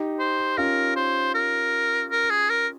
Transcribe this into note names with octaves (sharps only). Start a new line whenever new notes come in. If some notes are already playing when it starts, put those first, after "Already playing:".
Already playing: D#4 G4
C5
C#4 F4 A#4
C5
A#4
A#4
G#4
A#4